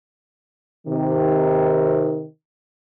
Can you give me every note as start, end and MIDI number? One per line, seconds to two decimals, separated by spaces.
0.87 2.25 48
0.87 2.25 51